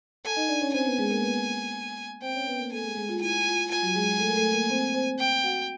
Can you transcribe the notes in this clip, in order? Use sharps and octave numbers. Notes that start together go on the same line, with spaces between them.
A4 G#5 A5
D#4 D#5
D4 D5
C#4 C#5
C4 C5 G#5
B3 B4
G#3 G#4
A#3 A#4
B3 B4
C4 C5 G5
C#4 C#5
B3 B4
A#3 A#4
A3 A4 G#5
G#3 G#4
G#3 G#4
F4
E4 G#5
F4
F4 G#5
F#3 F#4
G#3 G#4
A3 A4
A#4
A3 A4
A#3 A#4
C4 C5
C4 C5
G5
F#4 F#5